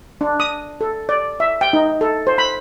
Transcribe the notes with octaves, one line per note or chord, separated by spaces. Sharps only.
D4
D#6
A4
D5
E5
G5
D#4
A4
C5
B5